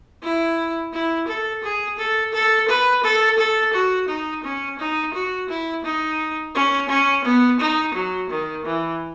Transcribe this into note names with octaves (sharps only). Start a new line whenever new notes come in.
E4
E4
A4
G#4
A4
A4
B4
A4
A4
F#4
D#4
C#4
D#4
F#4
E4
D#4
C#4
C#4
B3
D#4
F#3
D#3
E3